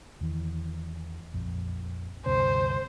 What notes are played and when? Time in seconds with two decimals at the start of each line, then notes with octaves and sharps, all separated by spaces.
0.21 E2 D#3 E3
1.34 A#1 F2
2.26 D2 G2 C3 C5